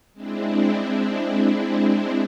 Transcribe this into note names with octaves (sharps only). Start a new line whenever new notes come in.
G#3 C4 D4 E4